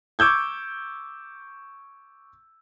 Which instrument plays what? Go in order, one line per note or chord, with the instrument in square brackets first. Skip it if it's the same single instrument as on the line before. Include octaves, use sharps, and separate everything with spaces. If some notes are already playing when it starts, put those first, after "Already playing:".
[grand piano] C#6 D6 E6 G6 G#6